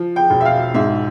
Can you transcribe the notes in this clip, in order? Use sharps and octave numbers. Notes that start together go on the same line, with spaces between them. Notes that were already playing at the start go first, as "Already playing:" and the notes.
Already playing: F3
G5
E1
E5
F5
G#2 E5